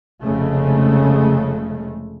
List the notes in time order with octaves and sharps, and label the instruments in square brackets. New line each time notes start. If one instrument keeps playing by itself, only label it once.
[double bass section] F1 C#3 G#3 A3